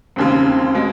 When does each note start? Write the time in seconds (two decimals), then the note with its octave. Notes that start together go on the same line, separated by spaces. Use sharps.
0.16 E1 D#2 C#3 C4
0.45 C4
0.75 B2 G#3